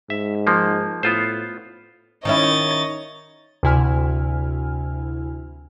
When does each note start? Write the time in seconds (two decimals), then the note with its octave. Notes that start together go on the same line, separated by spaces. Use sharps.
0.10 G#2 E5
0.47 F3 A#3
1.03 A2 B3 F4 C5
2.25 D#3 C#4 E4 C#5 D#5 A6
3.63 D2 C3 E4 G#5 F6